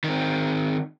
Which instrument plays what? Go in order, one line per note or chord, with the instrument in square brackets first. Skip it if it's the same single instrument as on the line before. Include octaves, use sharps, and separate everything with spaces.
[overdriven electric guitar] D#3 C4